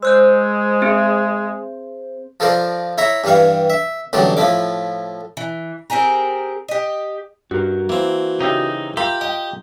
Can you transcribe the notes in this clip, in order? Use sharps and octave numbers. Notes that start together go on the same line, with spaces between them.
G#3 C5 E6 F#6 G6
C4 G#4
F3 A4 A#4 C5 D5
E4 C#5 E5 A#5
G2 E3 G3 F5 C#6
E5
A1 D3 F#3 G3 A3 D5
A2 F3 E4 D6
E3
C4 G4 G#4 A#4
G4 D#5
G2 F#4 A#4
E3 A#3 C4
C#3 D#4 G4 E5
F4 G4 A#4 E5 B5
D#5 G5